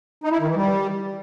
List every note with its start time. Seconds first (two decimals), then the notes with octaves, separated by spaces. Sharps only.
0.24 D#4
0.32 E4
0.40 D#3
0.48 E3
0.56 G3